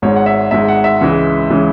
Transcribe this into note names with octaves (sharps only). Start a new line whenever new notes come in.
G#1 G#2 G#3 C#5
F#5
E5
G#1 G#2 G#3 E5
F#5
E5
C#2 C#3 E3 G#3
C#3 E3 G#3